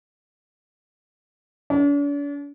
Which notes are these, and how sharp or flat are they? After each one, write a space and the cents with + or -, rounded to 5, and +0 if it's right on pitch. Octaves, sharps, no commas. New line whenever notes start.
D4 -45